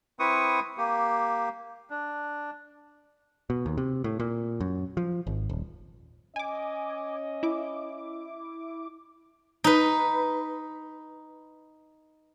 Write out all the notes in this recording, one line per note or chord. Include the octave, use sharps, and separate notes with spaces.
C4 E4 B4 C#6 D#6
A#3 G4
D4
B2
D#2
C3
A2
A#2
F#2
F3
G#1
D#1
C#4 D#5 G#5 D6
E4 D6
D#4 B4